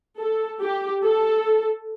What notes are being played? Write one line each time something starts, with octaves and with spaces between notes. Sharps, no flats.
A4
G4
A4